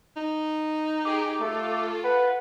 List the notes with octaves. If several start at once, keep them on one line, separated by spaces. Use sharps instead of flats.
D#4
G4 G#4 D6
A3 F4 A4
B4 F#5